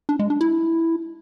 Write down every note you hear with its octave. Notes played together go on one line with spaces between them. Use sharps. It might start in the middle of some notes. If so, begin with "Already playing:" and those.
D4
G#3
D4
E4